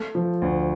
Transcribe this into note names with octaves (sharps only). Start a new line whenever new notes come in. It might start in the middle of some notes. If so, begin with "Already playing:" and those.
Already playing: A3
F3
D2